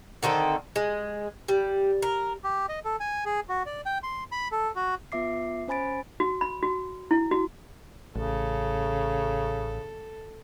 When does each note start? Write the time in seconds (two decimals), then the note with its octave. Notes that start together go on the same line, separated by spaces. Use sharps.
0.23 D3 D#3 C4 A4
0.76 G#3
1.48 G3
2.02 A#4
2.44 G4
2.69 D#5
2.85 A4
3.00 G#5
3.26 G#4
3.49 F#4
3.66 D5
3.86 G5
4.03 C6
4.32 B5
4.52 A4
4.76 F#4
5.12 B3 F4 E5 D6 C7
5.68 C#4 C5 G#5 B5 A6 D7
6.20 F#4
6.41 B5
6.63 F#4
7.11 E4
7.31 F#4
8.15 A1 C#3 A4